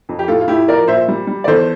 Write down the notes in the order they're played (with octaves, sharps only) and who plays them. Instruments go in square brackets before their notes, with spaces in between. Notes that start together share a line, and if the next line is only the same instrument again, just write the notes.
[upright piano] F2
G4
A2 F4 A4
F4
A2 E4 G4
F3 A#4 D5
A#2 C5 E5
G3
G3
D5
E2 A4 C5